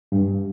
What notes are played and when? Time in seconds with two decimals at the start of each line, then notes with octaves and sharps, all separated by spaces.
0.12 G2